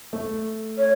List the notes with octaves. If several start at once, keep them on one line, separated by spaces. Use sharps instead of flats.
A3
C#5